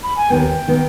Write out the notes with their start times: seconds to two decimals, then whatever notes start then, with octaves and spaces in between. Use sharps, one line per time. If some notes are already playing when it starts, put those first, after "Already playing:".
0.03 B5
0.16 G#5
0.30 D#2 D#3 B3 G5
0.68 D#3 B3